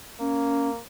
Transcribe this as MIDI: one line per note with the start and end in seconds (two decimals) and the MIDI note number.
0.20 0.80 58
0.20 0.69 61